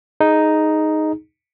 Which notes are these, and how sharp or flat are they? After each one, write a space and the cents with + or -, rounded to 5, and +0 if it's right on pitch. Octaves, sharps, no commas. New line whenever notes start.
D#4 +0 G#4 +10